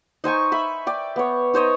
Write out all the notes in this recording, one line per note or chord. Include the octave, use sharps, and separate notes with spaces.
D#4 C5 G#5 C#6
E5 B5
D5 G5
B3 C#5
D#4 C5 C#5 D#5